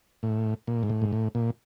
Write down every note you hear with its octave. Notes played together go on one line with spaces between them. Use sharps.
A2
A#2
G#2
A2
G#2
A2
A#2